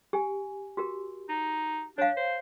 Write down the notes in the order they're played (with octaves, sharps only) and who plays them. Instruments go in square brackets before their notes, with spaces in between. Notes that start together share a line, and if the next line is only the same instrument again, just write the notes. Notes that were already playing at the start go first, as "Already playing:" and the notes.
[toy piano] G4 G#5
F#4 G4 A#4
[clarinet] D#4
[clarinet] D4 [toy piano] C#5 F5
[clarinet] C5